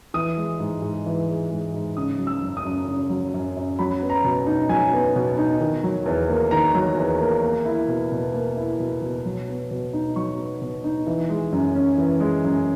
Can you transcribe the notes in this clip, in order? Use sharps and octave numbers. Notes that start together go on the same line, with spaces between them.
E3 D#6
G#3
G#2
G#2
E3
G#3
G#2
G#2
C#3 D#6
F#3
E6
F#2
D#6
F#2
C#3
F#3
F#2
F#2
F#3 B5
B3
A#5
B2
D#4
F#3 G#5
B3
B2
D#4
D#3
F#3
E2
A#3
D#3 A#5
F#3
E2
A#3
A#3
E4
B2
B2
A#3
E4
B2
B2
F#3
B3
B2
D#4
F#3 C#6
B3
B2
D#4
E3
G#3
F#2
C#4
E3
G#3
F#2